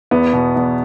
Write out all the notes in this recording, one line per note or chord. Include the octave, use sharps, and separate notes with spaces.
E2 B3
B2
E2